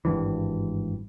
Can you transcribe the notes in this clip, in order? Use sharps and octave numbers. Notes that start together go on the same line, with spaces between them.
G#1 G2 E3